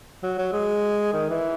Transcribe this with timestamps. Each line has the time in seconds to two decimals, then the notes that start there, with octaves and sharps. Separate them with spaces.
0.23 F#3
0.38 F#3
0.53 G#3
1.14 D#3
1.30 E3